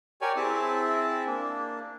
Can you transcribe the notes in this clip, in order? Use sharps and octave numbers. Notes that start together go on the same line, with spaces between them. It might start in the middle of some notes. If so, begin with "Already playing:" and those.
G4 A#4 C#5 D5 G#5
C4 E4 G#4 E5 A5
A#3 D4